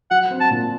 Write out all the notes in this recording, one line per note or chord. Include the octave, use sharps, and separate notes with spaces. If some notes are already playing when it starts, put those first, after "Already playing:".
F#3 F#5
C4
A5
A#2